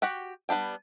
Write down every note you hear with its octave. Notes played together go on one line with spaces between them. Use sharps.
F#4 G4 F#5 G5
G3 B3 D4 G5